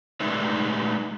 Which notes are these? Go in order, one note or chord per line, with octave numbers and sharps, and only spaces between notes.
G#3 A3 D#4 B4 D5 E5